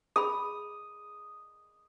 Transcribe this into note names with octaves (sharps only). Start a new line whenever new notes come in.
G#4 B5 D#6